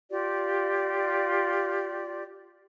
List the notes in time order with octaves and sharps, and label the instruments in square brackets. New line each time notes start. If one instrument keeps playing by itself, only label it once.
[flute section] F4 G4 D5